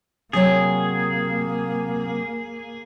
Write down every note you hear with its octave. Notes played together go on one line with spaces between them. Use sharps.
C3 F#3 A#3 G#4 C#5